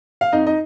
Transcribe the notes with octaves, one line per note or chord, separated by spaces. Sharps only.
F5
F2 D#4 D#5
D#4 D#5